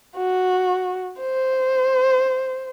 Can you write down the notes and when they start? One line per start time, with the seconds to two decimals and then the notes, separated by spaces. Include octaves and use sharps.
0.16 F#4
1.20 C5